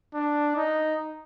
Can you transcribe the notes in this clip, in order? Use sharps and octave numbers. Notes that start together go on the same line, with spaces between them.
D4
D#4